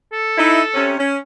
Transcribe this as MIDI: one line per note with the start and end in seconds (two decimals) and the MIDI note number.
0.13 0.88 69
0.38 0.60 63
0.38 0.60 64
0.74 0.94 48
0.74 0.94 61
0.98 1.17 61